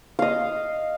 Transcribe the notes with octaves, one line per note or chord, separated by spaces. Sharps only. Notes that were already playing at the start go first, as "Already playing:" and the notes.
D#5 F5